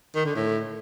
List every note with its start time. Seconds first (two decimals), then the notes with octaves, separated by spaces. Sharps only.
0.15 D#3
0.25 D3
0.35 A2